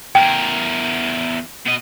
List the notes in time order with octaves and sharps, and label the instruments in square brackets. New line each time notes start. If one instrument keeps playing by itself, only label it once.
[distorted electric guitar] E2 A#4 [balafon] G5
[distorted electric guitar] B2 D#5